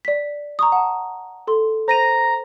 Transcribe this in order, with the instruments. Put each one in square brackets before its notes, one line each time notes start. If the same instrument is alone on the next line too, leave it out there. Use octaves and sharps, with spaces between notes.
[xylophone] D5 B6
A#5 C#6 D#6
F#5 A5
A4 C6
[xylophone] C5 A#6 D#7 [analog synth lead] A#5